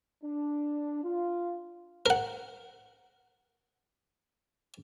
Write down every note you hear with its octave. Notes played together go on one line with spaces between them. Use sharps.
D4
F4
A#4 F#5